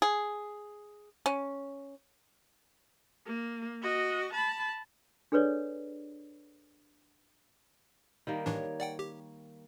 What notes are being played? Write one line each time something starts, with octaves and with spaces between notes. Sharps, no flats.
G#4
C#4
A#3
F#4 D#5
A5 B5
D4 G#4 A4 B4 C#5 D5
D#3 G3 A#3
A2 E3 D4 C#5
D5 F#5 G5
G4